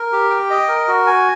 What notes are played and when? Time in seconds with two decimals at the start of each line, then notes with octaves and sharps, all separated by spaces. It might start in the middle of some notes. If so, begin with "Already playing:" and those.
Already playing: A#4
0.12 G4
0.30 G5
0.50 D#5
0.68 A#4
0.88 F#4
1.07 G#5